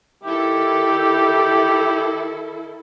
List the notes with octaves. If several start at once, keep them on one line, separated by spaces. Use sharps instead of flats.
D#3 E4 G4 A4